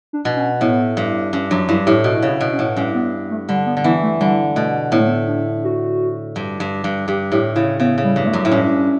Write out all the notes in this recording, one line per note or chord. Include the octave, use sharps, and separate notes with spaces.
D4
B2
C#4
A2 B3
G2
G2 C#4
F#2 D4
G2 E4
A2 G4
B2 F#4
C#3
E4
B2
C#4
A2
G2 C#4
B3
A3
D3 G3
B3
D3
E3 B3
A3
D3 G3
B2 A3
A2 B3
A3
B3
D4
F#4
G2
G2
G2
G2 G4
A2 G4
C#3 E4
C#3 B3
C#3
G3
G2
G3
A3
F#2
A2
G2 C#4